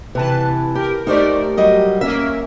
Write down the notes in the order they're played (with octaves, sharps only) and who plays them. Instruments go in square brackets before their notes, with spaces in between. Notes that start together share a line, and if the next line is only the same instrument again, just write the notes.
[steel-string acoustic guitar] C3 E3 [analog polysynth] B4 A5
[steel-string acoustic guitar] G4 [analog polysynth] A#4
[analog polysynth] A3 G4 A#4 [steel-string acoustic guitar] D#4 C5 D5
[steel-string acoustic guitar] F#3 G3 D#5
[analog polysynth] A#3 C#4 A#4 [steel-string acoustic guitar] E5